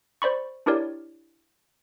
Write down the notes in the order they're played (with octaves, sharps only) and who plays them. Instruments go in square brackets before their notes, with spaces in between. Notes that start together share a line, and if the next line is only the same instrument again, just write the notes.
[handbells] C5 D5 B5 C#6
D4 E4 G4 A#4 C#5 D5